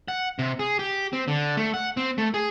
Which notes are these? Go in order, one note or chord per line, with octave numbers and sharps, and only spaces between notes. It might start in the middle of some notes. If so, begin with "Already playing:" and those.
F#5
C3
G#4
G4
C4
D3
A3
F#5
C4
A3
G#4